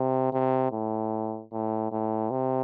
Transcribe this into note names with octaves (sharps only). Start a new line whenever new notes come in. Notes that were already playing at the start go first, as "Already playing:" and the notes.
Already playing: C3
C3
A2
A2
A2
C3